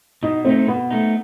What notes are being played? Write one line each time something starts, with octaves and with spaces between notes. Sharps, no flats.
B2 D#4
A3 C4 D#4
B2 B3
A3 D#4